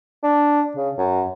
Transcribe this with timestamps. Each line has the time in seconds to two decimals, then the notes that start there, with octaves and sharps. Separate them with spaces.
0.23 D4
0.76 C#3
0.98 F#2